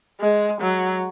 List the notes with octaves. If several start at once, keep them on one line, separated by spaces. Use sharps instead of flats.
G#3
F#3